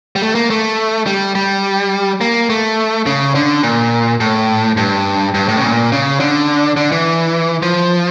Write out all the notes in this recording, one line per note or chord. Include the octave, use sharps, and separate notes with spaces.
G3
A3
A#3
A3
G3
G3
A#3
A3
C#3
D3
A#2
A2
G2
G2
A2
C#3
A#2
C#3
D3
D3
E3
F3